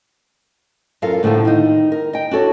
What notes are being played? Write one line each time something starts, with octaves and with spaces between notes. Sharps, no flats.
F#2 F4 A4 A#4 F5
A2 D3 F3 G3 A3
D#3 D#4
A#4
D#5 G5
D4 F#4 A4 C#5